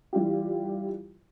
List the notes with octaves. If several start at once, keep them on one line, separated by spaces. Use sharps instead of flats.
E3 G3 F4 G4